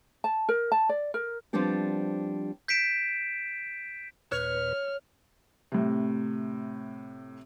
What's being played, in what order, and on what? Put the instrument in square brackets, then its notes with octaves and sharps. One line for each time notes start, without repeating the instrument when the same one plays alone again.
[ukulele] A5
A#4
A5
D5
A#4
[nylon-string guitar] F3 G3 B3 C4 D4 G4
[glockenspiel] G6 B6 C7 D7 E7
[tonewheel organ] D#2 A#2 B4 [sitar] C#5 [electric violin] F6
[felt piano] A2 C3